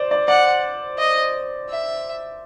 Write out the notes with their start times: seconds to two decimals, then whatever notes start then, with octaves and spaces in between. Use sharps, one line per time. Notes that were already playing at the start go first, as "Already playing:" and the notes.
Already playing: C5 D5
0.11 D5
0.28 D5 F#5
0.98 D#5
1.69 E5